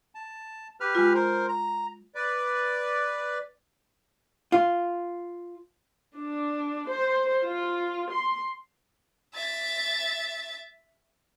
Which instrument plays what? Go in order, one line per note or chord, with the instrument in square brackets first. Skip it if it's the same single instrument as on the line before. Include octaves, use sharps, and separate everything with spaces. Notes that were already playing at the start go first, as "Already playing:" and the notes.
[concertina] A5
G4 B4 F6
[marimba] G#3 F4
[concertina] A#4 C5
A#5
[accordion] B4 D5
[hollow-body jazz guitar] F4
[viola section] D4
C5
F4
C6
[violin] E5 A6